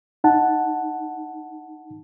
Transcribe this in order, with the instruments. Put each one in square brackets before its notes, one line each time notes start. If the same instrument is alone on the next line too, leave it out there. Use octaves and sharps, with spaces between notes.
[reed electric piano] D#4 F#5 A5